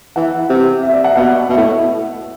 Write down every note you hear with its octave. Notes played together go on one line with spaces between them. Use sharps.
E3 F#5
C3
E5
D5
F#5
B2 F#5
B2 E5
A2